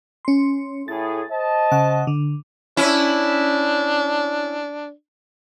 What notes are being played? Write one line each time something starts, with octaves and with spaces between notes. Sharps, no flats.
C#4 C6
A2 G#4 A6
C5 D#5 A5
C#3 F#5
D3
C#4 D4 E4